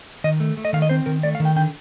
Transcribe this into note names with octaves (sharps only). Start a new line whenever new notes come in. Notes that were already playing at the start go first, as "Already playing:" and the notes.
D#3 D#5
A3
A3
D#5
D#3 F5
D#5
C4 C5
D#3 A#4
A3 D5
F5
D#3
G5
D3 G5